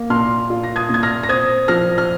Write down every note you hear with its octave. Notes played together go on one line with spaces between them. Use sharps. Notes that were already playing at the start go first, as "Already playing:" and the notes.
Already playing: A#3
A#2 C6 F6
F4
A#6
D#6 G#6
A#2 G#6
F6 A#6
A#6
C4 D#6 G#6
F3 F6 A#6
F6